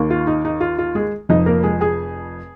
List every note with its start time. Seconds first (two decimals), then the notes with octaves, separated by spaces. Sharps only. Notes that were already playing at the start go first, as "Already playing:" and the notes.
Already playing: D#2 D#3 A#3
0.10 F4
0.27 D#4
0.45 D#4
0.61 F4
0.79 F4
0.95 G#3 G#4
1.29 F1 F2 F3 D#4 D#5
1.46 A#3 A#4
1.64 G#3 G#4
1.81 G#4 G#5